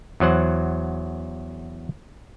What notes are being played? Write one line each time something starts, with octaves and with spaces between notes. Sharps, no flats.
E2 F#3 C5 F#5